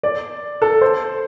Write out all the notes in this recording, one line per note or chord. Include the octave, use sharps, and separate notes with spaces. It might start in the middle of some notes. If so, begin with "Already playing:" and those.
D5
A4
C5